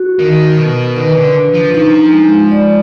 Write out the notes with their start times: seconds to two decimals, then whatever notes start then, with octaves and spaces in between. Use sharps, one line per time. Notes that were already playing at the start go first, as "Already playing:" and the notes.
Already playing: F#4
0.19 D#3 A#4
0.57 B2 A#4
0.96 D#3 B4
1.15 D3
1.34 D4
1.54 F3
1.74 F3 D#4
2.12 G#3
2.51 D5